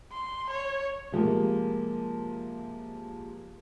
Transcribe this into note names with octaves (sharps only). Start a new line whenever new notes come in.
C6
C#5
C3 F3 G#3 A#3